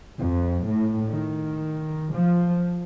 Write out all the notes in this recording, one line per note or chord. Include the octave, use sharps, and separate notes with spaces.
F2
A2
D#3
F3